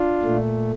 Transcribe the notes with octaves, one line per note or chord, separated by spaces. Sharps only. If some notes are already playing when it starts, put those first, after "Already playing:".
Already playing: D4 F4
A#2 A3